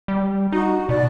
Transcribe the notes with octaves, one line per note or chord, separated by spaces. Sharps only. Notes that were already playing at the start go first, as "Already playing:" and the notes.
G3
D#4 F#4
B2 D5